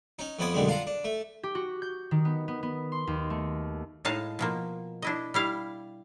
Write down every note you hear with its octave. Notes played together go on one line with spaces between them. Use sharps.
C#4 D#4
F2 F3 B3 D5 G#5 D#6
F#2 B2 D3 G3 G#3
D4 F4 F5 F#5 A#5
D4
A3
G4
F#4
G6
D#3
B3
B3
B3
C6
D#2
A3
A2 G#3 D#4 F5 A5
B2 F3 A#3
D4 E4 D#5
G3 E4 F5